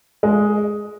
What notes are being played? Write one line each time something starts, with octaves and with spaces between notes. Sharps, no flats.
G#3